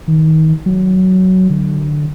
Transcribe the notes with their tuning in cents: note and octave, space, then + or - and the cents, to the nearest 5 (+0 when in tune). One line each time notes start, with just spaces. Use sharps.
D#3 +25
F#3 +10
D3 +15